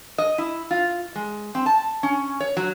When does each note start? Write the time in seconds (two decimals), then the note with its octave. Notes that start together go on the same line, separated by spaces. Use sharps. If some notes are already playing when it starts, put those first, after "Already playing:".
0.18 D#5
0.38 E4
0.71 F4
1.15 G#3
1.55 C4
1.66 A5
2.03 C#4
2.40 C#5
2.57 F#3